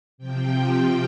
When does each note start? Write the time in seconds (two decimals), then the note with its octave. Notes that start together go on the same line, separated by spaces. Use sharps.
0.18 C3 F3 G5